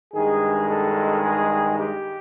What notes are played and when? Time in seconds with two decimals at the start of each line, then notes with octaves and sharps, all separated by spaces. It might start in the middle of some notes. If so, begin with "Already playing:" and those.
0.14 G2 D#3 G#3 G#4
0.68 A4
1.23 G#4
1.78 G4